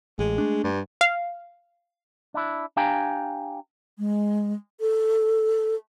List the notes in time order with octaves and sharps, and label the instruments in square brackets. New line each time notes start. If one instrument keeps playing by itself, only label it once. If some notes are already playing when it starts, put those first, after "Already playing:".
[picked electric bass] A1 [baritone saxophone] G#3
[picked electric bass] A3 D4
[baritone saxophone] G2
[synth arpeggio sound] F5
[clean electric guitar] D4 E4
D4 G4 F5 G5 G#5 A#5
[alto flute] G#3
A4